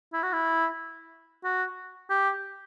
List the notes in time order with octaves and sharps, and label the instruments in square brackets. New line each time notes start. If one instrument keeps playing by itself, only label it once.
[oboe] E4
F#4
E4
F#4
G4